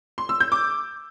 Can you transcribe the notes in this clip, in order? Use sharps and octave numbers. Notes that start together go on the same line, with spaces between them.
C6
E6
G6
D6